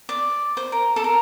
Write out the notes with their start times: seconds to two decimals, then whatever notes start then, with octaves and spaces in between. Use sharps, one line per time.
0.09 D5
0.57 C5
0.72 A#4
0.96 A4
1.04 A#4